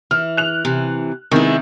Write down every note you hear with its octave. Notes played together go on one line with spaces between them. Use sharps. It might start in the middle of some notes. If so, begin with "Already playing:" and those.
E3 F6
F#6 F7
C3 E3
C3 D#3 G#3 B3 E4